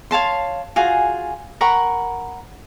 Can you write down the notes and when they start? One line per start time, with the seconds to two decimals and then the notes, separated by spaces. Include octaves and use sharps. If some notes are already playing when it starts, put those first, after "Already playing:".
0.11 C#5 F5 A5 C6
0.76 F4 F#4 G#4 G#5
1.61 A#4 F#5 B5 C#6